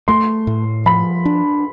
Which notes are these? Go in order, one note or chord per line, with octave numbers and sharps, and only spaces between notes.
A3 C6
A2
F3 B5
D4